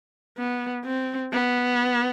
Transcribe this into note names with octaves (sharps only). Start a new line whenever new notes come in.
B3
C4
B3